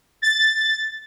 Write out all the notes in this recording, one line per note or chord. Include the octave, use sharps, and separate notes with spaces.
A6